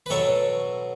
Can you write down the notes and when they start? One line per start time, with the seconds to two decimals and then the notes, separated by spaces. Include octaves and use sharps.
0.06 B4
0.10 B2 F#3 A4 C#5